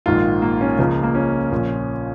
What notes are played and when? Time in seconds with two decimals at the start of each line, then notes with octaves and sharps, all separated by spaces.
0.06 A#1 G#2 D#3 F4
0.42 A#3
0.61 C#4
0.78 C#2 C#3 F3 A#3
1.03 A#3
1.15 C#4
1.51 A#1 A#2 F3